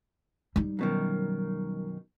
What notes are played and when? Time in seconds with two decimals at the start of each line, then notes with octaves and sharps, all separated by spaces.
0.56 G3 D#4
0.79 F#2 B2 D#3